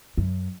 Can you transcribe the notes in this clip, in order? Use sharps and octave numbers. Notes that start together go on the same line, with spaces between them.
F#2